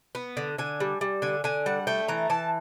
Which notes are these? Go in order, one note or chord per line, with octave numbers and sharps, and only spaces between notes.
B3
D3
D3 G#5
G3
G3
D3 G#5
D3 G#5
G3 F#5
A3 G5
E3 A#5
E3 A5